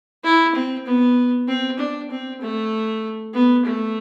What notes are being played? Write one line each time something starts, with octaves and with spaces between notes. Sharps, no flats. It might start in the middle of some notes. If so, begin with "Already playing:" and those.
E4
C4
B3
C4
D4
C4
A3
B3
A3